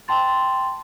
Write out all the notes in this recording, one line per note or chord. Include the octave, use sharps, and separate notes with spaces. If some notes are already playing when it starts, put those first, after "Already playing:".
G5 A5 C6 A6